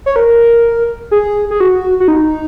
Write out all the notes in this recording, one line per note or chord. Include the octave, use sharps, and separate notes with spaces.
C#5
A#4
G#4
G#4
F#4
F#4
D#4